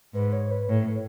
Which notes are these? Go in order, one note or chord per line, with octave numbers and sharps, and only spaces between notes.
G#2 B4
C#5
B4
A2 C#5